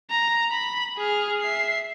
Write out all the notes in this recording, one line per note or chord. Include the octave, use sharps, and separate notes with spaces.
A#5
B5
G#4 F6
E5 C7